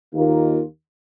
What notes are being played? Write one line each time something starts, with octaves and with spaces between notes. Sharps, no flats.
D#2 D#3 A#3 F4 A#4